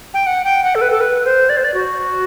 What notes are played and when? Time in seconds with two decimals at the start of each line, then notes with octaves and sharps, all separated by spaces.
0.14 G5
0.27 F#5
0.44 G5
0.64 F#5
0.75 A4
0.81 B4
0.91 A4
1.01 B4
1.25 C5
1.49 D5
1.57 C5
1.64 D5
1.74 F#4